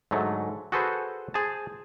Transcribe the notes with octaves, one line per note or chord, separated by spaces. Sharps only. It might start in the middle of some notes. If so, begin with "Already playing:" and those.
G#2 D3 F#3 A3
F#4 G#4 A4 B4 C5
G#4 C5 A5